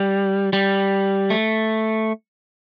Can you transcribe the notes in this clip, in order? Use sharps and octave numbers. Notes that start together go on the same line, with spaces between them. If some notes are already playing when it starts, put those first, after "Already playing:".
Already playing: G3
G3
A3